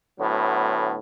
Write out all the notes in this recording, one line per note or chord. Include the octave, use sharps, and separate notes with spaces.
D2 A2 F#3 B3